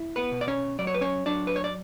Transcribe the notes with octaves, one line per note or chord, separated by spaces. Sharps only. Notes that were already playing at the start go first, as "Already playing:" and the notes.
Already playing: E4
B3 B4
B2
D5
C#4 C#5
F#3 D5
C#5
B4
C#4 C#5
F#3 D4 D5
B4
C#5
D5